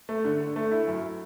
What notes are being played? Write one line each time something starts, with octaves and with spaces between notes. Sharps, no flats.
A3
D3
D3
A3
E4
F#2